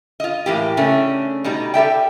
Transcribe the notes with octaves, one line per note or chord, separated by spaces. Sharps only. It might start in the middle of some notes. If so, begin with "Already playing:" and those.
F4 D#5
A2 E3 A#3 G4
C#3 A3 C#4 D4
B2 G3 D#4
G4 A4 E5 G5